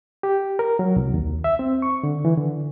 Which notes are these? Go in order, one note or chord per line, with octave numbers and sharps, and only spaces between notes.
G4
A#4
F#3
C2
D#2
E5
C4
C#6
D3
E3
D3